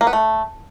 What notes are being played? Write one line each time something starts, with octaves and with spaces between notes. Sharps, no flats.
A#3
B3
A3